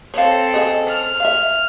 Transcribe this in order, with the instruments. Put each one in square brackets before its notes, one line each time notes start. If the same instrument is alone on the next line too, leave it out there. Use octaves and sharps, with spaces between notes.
[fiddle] C4 A4 [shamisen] C#5 F5
[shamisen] C#3 G#4 D#5
[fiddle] F6
[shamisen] E5 F5